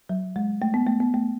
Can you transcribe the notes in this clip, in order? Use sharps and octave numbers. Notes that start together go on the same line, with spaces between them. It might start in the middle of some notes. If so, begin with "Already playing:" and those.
F#3
G#3
A3
B3
A3
B3
A3